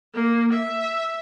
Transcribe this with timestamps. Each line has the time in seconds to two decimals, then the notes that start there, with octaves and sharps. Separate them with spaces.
0.14 A#3
0.54 E5